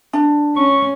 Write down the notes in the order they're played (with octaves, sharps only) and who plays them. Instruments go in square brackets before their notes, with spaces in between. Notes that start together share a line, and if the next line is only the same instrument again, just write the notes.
[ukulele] D4
[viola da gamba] C#4 [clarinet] C#6